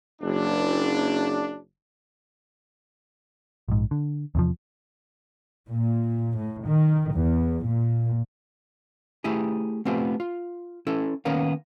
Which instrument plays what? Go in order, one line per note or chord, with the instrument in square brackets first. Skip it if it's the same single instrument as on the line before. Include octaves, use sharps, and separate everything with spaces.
[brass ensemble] F#1 D4
[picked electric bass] A#1 G#2
D3
E2 C3 F3
[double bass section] A#2
A2
D#3
E2
A#2
[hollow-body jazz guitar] A3 E4 G4 G#4
A3 B3 C4 F4 G4
F4
C#4 E4 A4
D#3 A#3 B3 C#4 A#4 F5